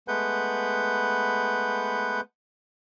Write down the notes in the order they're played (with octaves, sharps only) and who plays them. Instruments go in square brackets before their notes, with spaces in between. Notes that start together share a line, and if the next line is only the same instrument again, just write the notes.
[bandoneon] G#3 A3 B3 B4 F#5 G6